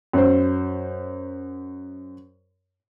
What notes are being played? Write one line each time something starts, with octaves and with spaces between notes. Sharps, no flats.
F#2 C5